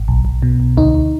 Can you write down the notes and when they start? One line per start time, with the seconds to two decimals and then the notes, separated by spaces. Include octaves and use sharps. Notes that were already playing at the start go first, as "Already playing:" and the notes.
Already playing: G#1
0.08 B1
0.25 B1
0.42 B2
0.60 B1
0.77 D2 D#4
0.94 D2